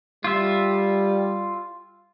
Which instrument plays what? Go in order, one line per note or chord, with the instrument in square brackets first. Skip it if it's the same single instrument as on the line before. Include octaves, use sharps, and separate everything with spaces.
[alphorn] G3 [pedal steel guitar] F4 E5